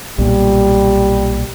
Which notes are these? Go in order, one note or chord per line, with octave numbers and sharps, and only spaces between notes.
B1 A#2 G3